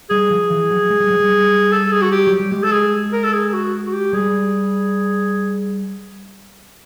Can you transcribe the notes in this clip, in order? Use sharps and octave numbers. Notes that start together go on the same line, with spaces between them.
G3 G#4
F3
E3
F#3
G#3
G3
F#3
G3
A4
G#4
F#4
G4
F#3
G3
G#3 G4
A4
G#4
A#4
A4
G#4
F#4
F#4
G4
G3 G#4